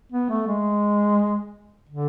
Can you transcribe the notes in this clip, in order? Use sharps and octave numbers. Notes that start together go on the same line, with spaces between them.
B3
A3
G#3
D3